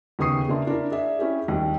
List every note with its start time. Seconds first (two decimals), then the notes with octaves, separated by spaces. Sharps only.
0.19 D#2 C#3 B3 C#6 D#6 C7
0.48 C#3 A#3 D4 E5 C6
0.67 D4 E4 A#4
0.92 G#4 D5 E5
1.19 C#4 E4 G4 G#4
1.48 D#2 G3